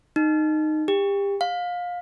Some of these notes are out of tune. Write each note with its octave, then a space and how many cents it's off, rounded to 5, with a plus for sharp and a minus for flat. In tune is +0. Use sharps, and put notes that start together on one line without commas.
D#4 -10
G4 +30
F5 +25